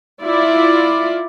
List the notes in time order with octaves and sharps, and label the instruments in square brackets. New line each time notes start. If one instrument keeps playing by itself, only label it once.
[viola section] E4 F4 D5